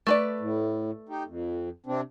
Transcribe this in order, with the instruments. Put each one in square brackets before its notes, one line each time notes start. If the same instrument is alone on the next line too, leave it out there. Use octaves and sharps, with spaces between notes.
[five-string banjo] A3 B4 D5
[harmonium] A2
D#4 G4
F2
C3 C4 D4